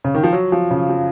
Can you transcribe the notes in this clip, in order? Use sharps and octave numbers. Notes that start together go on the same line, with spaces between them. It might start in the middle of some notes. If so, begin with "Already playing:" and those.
C#3
D#3
F3
F#3
F3
C#3
F3